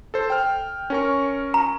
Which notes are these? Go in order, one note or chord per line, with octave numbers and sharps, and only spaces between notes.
A4 C5
G5 F6
C#4 A#4 C#6
A#5